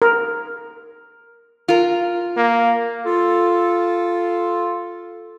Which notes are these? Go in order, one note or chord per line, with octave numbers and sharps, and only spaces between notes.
A#4
F4 A#4
A#3
F4 A4